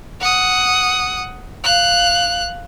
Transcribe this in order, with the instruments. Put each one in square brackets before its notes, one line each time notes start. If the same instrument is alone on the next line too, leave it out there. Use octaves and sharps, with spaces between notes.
[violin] F#5 D#6
F5 F#6